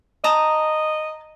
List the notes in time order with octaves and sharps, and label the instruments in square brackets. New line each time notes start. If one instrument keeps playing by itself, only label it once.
[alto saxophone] D#5 [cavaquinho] A5 A#5 D#6